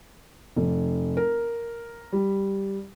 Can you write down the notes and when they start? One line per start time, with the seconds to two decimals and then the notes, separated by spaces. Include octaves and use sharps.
0.56 F1
1.17 A#4
2.13 G3